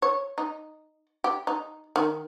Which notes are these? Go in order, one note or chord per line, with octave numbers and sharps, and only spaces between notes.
C#5
D#4
G4
D#4
D#3